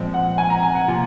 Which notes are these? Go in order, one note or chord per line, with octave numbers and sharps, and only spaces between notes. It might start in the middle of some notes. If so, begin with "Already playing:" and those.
Already playing: A#2 F3 G#3 C4
F#5
G#5
A#5
G#5
F#5
C3 F3 A#3 F4